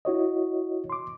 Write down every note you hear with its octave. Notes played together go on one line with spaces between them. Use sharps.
E4 F#4 C#5 D#5
C6 D6